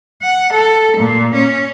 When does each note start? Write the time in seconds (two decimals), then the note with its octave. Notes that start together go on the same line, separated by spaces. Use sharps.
0.22 F#5
0.53 A4
0.97 A#2
1.34 C#4